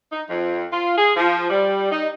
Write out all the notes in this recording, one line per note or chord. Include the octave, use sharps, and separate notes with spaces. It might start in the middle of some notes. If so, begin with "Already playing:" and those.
D#4
F2
F4
G#4
F3
G3
D#4